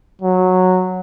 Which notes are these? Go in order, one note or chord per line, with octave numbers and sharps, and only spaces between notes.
F#3